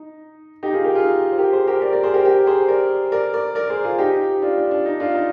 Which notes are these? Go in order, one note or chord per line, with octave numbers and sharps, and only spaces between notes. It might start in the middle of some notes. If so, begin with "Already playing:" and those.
Already playing: D#4
D#4 G4
F4 G#4
G4 A#4
F4 G#4
C5
G4 A#4
G#4 C5
G4 A#4
A#4 D5
A#4 D5
G#4 C5
G4 A#4
G4 A#4
G#4 C5
A#4 D5
A#4 D5
A#4 D5
A#4 D5
G#4 C5
F4 G#4
D#4 G4
D4 F4
D4
D4
D#4
D4 F4
D#4